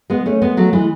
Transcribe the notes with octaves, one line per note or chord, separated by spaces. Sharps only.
G#3 B3
A3 C#4
G#3 B3
F#3 A3
E3 G#3